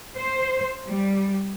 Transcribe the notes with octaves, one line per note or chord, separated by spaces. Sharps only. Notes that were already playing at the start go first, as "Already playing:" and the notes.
C5
G3